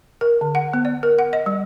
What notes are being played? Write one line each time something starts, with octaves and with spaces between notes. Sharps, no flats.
A#4
D3
F#5
B3
D5
A#4
F#5
D#5
G3